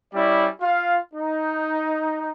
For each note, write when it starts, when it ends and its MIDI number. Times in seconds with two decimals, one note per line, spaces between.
0.14 0.47 55
0.14 0.47 61
0.14 0.47 64
0.14 0.47 74
0.61 0.97 65
0.61 0.97 77
1.14 2.31 63